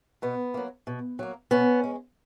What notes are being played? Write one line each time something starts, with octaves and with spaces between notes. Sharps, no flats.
B2 B3
F#3 A#3
B2
F#3 A#3
B2 B3 C#4
G#3